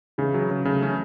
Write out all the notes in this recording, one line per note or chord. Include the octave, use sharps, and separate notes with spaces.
C#3 E3 G#3
F#3
C#3
C#3 F#3 A3
E3 G#3 C#4